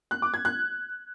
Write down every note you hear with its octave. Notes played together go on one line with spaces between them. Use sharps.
F#6
D6
G#6
F#6